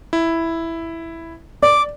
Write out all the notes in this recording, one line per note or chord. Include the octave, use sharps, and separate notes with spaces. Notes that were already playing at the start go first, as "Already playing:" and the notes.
E4
D5 D6